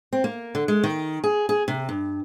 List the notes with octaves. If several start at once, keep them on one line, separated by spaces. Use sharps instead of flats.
C4
A#3
D3
G#3
D#3
G#4
G#4
C3
G2